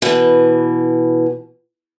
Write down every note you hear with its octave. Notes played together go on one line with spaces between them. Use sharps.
B2 E3